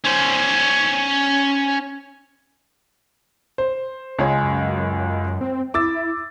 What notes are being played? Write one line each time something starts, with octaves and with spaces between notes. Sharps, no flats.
C#4 C5
C5
C#2 G#3 C#5
F#2
C4
E4 D6 E6 A6